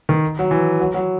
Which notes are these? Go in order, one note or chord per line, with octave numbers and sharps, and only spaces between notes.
D#3
F#3
E3
F#3
F#3